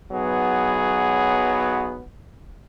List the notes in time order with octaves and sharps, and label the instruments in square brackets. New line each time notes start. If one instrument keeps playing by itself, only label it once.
[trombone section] B1 F#3 B3 [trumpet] G#4